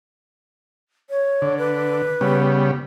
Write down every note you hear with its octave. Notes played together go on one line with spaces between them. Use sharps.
C#5
D3
B4
C#3 G3 B3